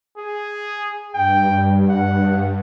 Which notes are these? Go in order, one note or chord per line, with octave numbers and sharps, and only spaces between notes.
G#4
G2 G5
F#5